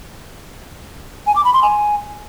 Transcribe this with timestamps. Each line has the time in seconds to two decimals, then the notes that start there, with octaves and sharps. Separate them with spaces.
1.27 G#5
1.36 D6
1.45 B5
1.53 C6
1.62 G#5